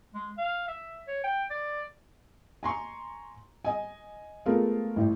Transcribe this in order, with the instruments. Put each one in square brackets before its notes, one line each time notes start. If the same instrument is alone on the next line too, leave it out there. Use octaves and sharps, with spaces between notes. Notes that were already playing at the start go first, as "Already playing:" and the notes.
[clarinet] G#3
F5
E5
C#5
G5
D5
[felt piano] G#5 A#5 C6 C#6
D#5 G#5
G#3 A3 B3 F4 A#4
A1 A2